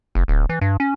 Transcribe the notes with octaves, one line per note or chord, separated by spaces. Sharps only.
F1
D1
E3
G2
C#4